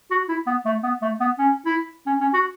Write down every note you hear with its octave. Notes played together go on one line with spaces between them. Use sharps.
F#4
E4
B3
A3
B3
A3
B3
C#4
E4
C#4
C#4
F#4